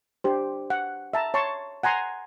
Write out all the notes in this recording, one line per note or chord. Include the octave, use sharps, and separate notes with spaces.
D4 G4 C5
F#5
E5 A5 A#5
C#5 A5 C6 C#6
F#5 G#5 A#5 C6